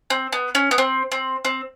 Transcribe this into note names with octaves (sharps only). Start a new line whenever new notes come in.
C4
B3
C#4
B3
C4
C4
C4